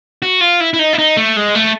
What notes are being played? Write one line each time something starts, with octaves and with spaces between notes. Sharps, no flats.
F#4
F4
E4
E4
D#4
E4
D#4
A3
G#3
A3